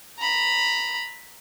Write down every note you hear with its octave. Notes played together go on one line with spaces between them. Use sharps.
A#5 B5